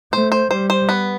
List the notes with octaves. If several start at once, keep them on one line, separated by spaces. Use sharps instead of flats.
A3 C5
C5
G3 C5
C5
B3